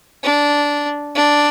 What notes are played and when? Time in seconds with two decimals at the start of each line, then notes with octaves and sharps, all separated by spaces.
0.24 D4
1.15 D4